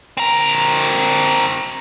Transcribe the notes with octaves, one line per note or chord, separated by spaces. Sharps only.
C4 A#4